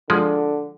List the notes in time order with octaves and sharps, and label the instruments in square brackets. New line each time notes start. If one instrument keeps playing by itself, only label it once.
[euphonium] D3 [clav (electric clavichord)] F3 G#3